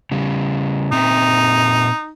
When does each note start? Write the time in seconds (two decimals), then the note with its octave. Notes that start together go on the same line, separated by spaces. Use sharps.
0.11 C#3 G3
0.92 A#2 C4 D#4 E5